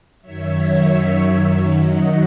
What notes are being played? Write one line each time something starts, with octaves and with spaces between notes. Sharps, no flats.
F#2 D#3 F#3 C#5 E5
D#5 F#5